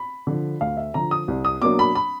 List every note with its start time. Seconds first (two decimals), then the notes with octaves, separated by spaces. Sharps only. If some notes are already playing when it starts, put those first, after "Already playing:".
Already playing: B5
0.27 D3 F3
0.61 D2 F5
0.77 E5
0.94 D3 F3 A#5
1.11 D#6
1.28 C2
1.45 D#6
1.62 B2 F#3 A#3 D4 D6
1.79 B5
1.95 B5